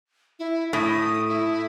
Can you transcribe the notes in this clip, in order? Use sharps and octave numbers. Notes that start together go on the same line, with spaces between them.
E4
A2 D#6
E4